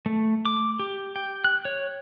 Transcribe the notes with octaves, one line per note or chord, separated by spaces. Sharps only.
A3
D6
G4
G5
F#6
C#5